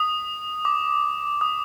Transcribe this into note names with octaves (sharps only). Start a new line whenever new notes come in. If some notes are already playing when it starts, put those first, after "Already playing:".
Already playing: D#6
D6
D#6